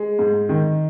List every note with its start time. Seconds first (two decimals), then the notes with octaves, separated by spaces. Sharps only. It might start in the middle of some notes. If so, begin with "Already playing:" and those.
Already playing: G#3
0.19 G#2
0.49 D#3